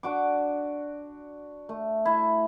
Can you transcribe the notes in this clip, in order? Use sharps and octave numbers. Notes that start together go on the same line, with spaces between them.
D4 F#4 D6
A3
E4